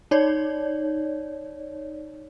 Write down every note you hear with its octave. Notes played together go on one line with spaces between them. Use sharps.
D#4 C#5 D5